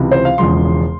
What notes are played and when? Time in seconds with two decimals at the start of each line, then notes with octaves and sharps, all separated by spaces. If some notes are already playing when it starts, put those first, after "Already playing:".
Already playing: C#2 C3 E3
0.11 C5
0.25 F5
0.38 E1 E2 C#3 F3 G#3 C6